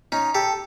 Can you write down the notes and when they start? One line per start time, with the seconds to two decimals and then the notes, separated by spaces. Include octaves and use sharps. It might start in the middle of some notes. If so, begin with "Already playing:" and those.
0.12 C#4 D#4
0.34 G4 A4